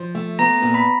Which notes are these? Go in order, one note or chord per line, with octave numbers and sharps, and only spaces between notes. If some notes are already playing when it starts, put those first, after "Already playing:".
Already playing: F3
A3
B3 A#5 A#6
A#2
B5 B6